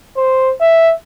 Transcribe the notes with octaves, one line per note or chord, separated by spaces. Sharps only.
C5
E5